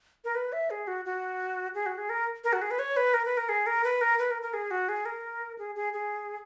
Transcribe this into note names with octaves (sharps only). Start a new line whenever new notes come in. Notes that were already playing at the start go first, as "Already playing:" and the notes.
A#4
B4
E5
G#4
F#4
F#4
G#4
F#4
G#4
A#4
A#4
F#4
G#4
B4
C#5
B4
A#4
B4
A#4
G#4
A#4
B4
A#4
B4
A#4
A#4
G#4
F#4
G#4
A#4
G#4
G#4
G#4